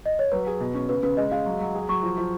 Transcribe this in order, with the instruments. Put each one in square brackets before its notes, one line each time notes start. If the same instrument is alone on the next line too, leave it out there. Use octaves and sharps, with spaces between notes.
[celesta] D#5
C#5
[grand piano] F#3 [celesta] B4
[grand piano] G#4
B2
C#4
[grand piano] C#3 [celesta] B4
[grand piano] C#3 [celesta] B4
[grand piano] G#3 [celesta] D#5
[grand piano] G#3 [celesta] F5
[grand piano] F#3
F#3
G#4
[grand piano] F#3 [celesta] C#6
[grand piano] F3
F3